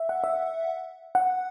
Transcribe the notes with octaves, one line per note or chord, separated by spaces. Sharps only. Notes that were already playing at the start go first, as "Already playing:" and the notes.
Already playing: E5
F#5
E5
F#5